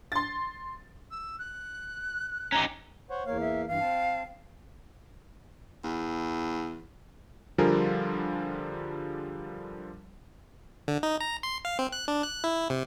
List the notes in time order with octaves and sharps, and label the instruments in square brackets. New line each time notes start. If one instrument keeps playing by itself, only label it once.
[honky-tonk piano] C6 A6
[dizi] E6
F#6
[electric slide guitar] C#4 D#4 G4 [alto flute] A#5
[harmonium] C5 C#5 F#5
[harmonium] E2 A#3 F5 [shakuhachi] C#5
[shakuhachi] E5
[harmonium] G2 E3 [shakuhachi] F5
[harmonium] C4 A5
[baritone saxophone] E2
[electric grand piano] D3 F3 G3 F4 G#4 A#4
[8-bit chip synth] D3
D#4
A#5
C6
F5
C4
F#6
D4
F#6
E4
C3